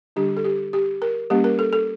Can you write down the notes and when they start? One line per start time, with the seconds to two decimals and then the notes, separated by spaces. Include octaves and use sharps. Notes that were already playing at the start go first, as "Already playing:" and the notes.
0.16 D3 G3 D4 G4
0.37 A4
0.45 G4
0.73 G4
1.02 A#4
1.30 G3 A#3 C#4 G4
1.44 A#4
1.59 A4
1.73 A4